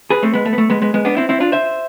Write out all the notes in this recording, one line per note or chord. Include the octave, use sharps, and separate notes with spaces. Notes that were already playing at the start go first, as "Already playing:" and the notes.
G#4 B4
A3 C4
G#3 B3
A3
B3
A3
G#3 B3
G#3 B3
G#3 B3
B3 D4
C4 E4
C4 E4
D4 F4
C5 E5